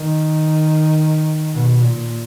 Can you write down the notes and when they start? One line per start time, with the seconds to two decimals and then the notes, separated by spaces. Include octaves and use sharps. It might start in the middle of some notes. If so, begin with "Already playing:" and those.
Already playing: D#3
1.52 B2
1.81 A#2